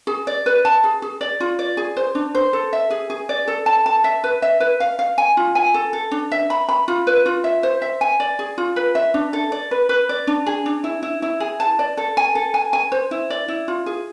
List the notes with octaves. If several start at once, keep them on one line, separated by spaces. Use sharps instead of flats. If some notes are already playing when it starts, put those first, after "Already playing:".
G#4
D5
B4
A5
G#4
G#4
D5
F4
D5
G#4
C5
D4
C5
A4
E5
G#4
G#4
D5
A4
A5
A5
E5
B4
E5
B4
F5
F5
G#5
F4
G#5
A4
A4
D4
E5
B5
B5
F4
B4
F4
E5
C5
E5
G#5
D5
G#4
F4
B4
E5
D4
A4
D5
B4
B4
D5
D4
G#4
D4
E4
E4
E4
G#4
A5
D5
A4
G#5
A4
G#5
G#5
C5
E4
D5
E4
F4
G#4